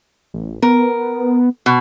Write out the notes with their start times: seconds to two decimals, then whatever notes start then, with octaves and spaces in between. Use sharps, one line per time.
0.34 A1
0.62 B3 A#4
1.66 B2